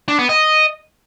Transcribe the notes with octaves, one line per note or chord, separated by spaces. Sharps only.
D4
B3
D#5